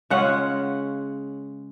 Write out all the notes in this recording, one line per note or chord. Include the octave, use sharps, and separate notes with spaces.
C#3 G#3 C#4 F4 F#5